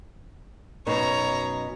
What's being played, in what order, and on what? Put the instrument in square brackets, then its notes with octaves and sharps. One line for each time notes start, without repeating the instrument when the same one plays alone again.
[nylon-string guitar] F#2 B2 D#4 [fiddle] C#5 A#5